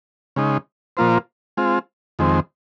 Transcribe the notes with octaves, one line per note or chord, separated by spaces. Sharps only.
C#3 G#3 D#4
A#2 F3 A#3 F4 C5
G#3 C4 F4
F2 D#3 G#3 C4